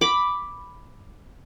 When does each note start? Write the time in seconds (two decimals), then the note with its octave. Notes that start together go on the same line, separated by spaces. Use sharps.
0.01 B5 D6